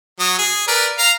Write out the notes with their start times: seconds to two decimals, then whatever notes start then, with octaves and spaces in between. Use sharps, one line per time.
0.20 F#3 D#6
0.39 G#4
0.68 A#4 B4 D5
0.98 F5 A#5